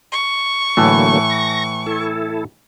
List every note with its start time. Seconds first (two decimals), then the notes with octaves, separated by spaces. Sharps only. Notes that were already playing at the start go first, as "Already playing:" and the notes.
0.12 C#6
0.77 A2 D3 E3 F#3 A3 A#3
1.30 A#6
1.86 E4 A4